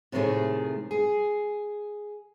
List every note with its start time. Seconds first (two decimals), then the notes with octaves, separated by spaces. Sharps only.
0.12 A2 C3 D#3 F3 A3 G#4
0.91 G#4